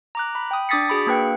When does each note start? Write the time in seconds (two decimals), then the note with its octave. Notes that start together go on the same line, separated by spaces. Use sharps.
0.15 A#5 D6 F#6
0.35 B5
0.51 G5 D#6
0.69 D4 D6 D#6 A6 B6 C#7
0.89 F#4 G#4 B5
1.07 A#3 D4 B4 G5 C#7